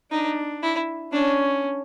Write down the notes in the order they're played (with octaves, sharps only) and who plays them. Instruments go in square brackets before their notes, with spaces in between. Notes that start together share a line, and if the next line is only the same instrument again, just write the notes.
[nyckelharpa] D4 [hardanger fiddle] D#4
[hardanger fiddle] E4
[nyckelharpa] C#4 [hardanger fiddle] D4